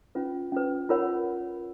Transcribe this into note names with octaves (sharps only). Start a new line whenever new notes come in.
C#4 F4 B4
C#4 F4 B4
F4 A#4 C#5 F#5 B5